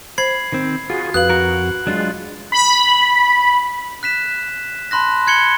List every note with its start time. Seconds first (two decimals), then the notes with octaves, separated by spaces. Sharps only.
0.18 C5 B5 G#6 C7
0.52 D#3 C4
0.90 F4 F#4 G#4
1.14 F2 F#4 B4 F5 F#6 F#7
1.29 F#4 A#4 A#5
1.87 F#3 G#3 D4 F4
2.52 B5
4.03 F#6 B6 E7
4.91 A5 B5 C6 F#6 A#6
5.27 F#6 G#6 C#7 F#7 G7